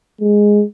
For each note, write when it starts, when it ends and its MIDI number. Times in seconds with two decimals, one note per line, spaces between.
0.21 0.64 56